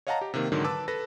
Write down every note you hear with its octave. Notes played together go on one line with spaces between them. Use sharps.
C#5 D#5 F5 F#5 A5 A#5
G4
C3 D#3 A#3
G#2 D3 D#3 F#3
B4 A5 D6 E6
A4 B4 A#6